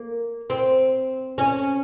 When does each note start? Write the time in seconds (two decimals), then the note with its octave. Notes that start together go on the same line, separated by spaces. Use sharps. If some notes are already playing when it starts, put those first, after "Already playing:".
Already playing: A#3
0.50 C4
1.38 C#4